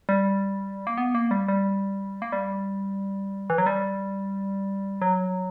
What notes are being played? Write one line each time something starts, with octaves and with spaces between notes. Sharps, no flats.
G3
A#3
B3
A#3
G3
G3
A#3
G3
E3
F#3
G3
F#3